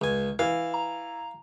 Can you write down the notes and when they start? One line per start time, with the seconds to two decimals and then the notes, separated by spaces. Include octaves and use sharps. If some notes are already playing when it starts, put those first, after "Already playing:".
0.01 C#2 G#5
0.39 E3 F5
0.74 A#5